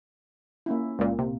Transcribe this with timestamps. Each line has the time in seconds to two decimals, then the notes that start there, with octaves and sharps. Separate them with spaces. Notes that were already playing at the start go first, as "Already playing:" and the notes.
0.66 A#3 C#4 E4
0.99 C#2 A#2
1.19 C3 A#3